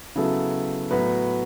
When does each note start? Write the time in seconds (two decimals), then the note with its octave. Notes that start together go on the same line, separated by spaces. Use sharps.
0.15 C#3 F#3 B3 E4 A4
0.91 A2 F#3 B3 F#4 B4